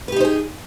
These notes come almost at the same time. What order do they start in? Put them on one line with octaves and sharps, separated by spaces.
B4 G4 D#4 C5 G#4